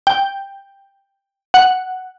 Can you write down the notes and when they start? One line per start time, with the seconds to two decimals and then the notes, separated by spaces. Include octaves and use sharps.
0.07 G5
1.54 F#5